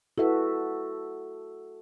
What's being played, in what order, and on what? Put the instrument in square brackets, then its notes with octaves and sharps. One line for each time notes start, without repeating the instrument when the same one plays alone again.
[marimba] E4 B4 [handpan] F#4 A4 E5